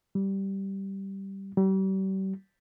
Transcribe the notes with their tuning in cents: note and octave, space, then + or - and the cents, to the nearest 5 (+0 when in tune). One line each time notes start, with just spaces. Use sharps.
G3 -10
G3 -40